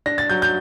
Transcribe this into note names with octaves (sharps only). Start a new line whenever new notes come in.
D4 A#6
A6
F#3 G6
G6